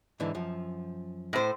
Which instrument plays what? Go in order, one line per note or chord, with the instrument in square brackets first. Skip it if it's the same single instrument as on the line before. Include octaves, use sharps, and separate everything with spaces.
[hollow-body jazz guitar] G#2 D3 E3
F#2 F3
[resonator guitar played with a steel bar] A2 C5